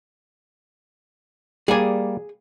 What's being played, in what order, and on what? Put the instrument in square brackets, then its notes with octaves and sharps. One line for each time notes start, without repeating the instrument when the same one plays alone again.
[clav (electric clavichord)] G3 A#3 D5 [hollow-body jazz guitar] G#4 G#5